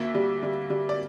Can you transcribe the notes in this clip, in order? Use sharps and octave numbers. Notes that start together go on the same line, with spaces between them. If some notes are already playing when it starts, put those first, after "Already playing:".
Already playing: D2 A#3 E5
G3
G3
G3
D5